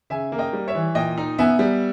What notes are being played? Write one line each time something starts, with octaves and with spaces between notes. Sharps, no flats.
C#3 E5 G#5
A#3
D#5 G5
G3
C#5 E5
E3
A#2 D#5 G5
D#4
B3 E5 G#5
G3